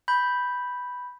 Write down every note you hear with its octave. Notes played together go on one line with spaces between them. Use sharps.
B5 G6